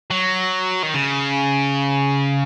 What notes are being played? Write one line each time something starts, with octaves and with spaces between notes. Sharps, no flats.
F#3
D#3
C#3